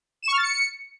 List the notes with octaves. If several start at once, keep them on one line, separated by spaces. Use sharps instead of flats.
E7
C#6
F6
A6
C#7